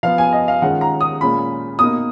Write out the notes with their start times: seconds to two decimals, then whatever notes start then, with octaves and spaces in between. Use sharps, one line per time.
0.03 F3 B3 F4 F5
0.18 G#5
0.33 D#5
0.48 F5
0.62 D#3 G#3 C#4 F4 F#5
0.81 A#5
1.01 D#6
1.21 A#2 G#3 C#4 F4 B5
1.79 B2 A#3 D#4 D#6